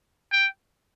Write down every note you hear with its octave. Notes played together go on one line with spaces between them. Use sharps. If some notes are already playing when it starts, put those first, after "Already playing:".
G5